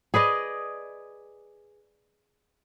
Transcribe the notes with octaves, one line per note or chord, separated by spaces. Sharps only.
G#4 B4 D5 D#5